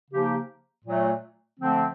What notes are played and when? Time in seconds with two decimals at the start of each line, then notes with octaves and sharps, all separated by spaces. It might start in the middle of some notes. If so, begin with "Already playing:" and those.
0.11 C#3 F3 A#3 D#4 G4
0.84 A#2 F#3 A3
1.59 D3 F3 A3 C4